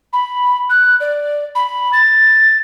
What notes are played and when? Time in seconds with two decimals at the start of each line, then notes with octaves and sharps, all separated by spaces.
0.13 B5
0.70 F#6
1.00 D5
1.55 B5
1.93 A6